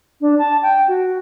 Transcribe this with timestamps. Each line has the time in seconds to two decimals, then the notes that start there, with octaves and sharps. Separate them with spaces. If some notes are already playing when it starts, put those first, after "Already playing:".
0.21 D4
0.39 A5
0.62 G5
0.88 F#4